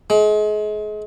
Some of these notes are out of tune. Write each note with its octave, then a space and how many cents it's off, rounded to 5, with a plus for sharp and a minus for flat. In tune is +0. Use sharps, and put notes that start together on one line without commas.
G#3 +35